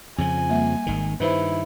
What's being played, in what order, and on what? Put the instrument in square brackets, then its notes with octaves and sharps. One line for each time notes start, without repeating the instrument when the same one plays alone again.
[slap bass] F2 C#3 F3 [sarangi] G#5
[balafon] G3 A#3 E5
[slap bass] G#1 D#3
[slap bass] G2 D#3 [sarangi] E4 [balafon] B4 C5